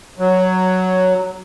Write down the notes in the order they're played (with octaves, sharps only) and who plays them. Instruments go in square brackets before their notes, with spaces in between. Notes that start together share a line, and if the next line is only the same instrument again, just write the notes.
[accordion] F#3